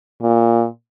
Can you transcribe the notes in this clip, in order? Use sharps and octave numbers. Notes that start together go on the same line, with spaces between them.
A#2